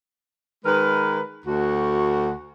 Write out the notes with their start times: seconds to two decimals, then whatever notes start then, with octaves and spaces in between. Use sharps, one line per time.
0.65 D#3 G#3 A#4 B4
1.46 D2 F#4